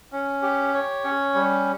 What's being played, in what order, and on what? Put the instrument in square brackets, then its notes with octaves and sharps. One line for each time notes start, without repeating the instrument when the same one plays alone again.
[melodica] C#4
G4
C#5
C#4
G3